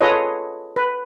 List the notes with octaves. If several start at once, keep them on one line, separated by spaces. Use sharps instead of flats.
F4 G#4 A4 B4 C#5 D#5
B4